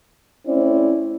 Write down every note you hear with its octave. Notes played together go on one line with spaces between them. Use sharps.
A3 C4 C#4 E4 C5 D5